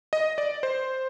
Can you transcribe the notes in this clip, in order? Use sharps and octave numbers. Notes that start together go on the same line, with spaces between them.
D#5
D5
C5